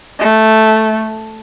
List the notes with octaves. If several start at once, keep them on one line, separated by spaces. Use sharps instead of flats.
A3